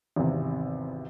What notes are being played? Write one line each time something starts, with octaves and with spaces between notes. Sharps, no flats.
G#1 E2 C3